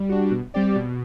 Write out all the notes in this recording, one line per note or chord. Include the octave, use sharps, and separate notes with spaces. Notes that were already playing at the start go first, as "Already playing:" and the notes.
Already playing: G3
D4 F#4
B2
G3 C4 G4 D5
B2